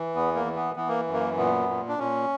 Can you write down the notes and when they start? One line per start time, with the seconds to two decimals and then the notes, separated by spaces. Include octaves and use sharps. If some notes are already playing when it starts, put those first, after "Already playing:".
Already playing: E3
0.15 E2 B3
0.35 A#3
0.45 E3
0.56 B3
0.76 E3 B3
0.88 A#3
1.08 F#2
1.13 A#3
1.37 A#2 B3
1.69 A#2
1.89 D4
1.99 A#2 C#4